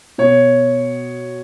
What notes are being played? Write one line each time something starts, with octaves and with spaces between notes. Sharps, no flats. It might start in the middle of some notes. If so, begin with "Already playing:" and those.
B2 C#5